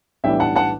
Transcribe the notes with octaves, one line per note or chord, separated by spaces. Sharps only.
B1 A2 E3 G3 D4 E5 G5
F#5 A5
F#5 A5